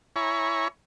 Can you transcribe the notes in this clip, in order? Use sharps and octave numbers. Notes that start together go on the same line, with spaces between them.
E4 C#5 G#5 A#5 B5 C#6